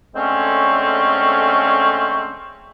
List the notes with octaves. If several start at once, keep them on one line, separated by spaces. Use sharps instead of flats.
D3 G#3 A3 C4 C#4